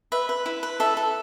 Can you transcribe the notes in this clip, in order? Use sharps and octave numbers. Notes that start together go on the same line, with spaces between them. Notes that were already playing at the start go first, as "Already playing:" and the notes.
B4 E5
B4
E4
B4
A4 E5
A4